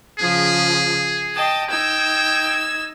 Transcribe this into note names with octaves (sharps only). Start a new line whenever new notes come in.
C#3 F3 G#4
D#5 G5 A5
D#4 G5 E6 G#6